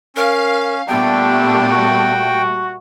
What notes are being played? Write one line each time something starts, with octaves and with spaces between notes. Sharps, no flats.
C#4 A#4 F5
A#2 D3 G3 A3 B3 D4 G5
F#4